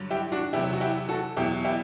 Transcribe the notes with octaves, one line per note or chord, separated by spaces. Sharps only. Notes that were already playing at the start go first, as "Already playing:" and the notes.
Already playing: G2 D3 F#3
E4 G4
D4 F#4
E2 C3 F#3 E4 G4
F#4
E4 G4
F#4 A4
E2 B2 F#3 E4 G4
E4 G4